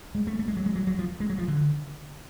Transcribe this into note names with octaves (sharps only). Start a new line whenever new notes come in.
G#3
A3
A3
G#3
F#3
G#3
F#3
F#3
F3
G#3
F#3
F3
D3